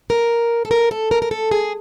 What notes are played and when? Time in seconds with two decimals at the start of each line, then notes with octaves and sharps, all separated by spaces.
0.10 A#4
0.65 A4
0.71 A#4
0.91 A4
1.11 A#4
1.22 A#4
1.31 A4
1.51 G#4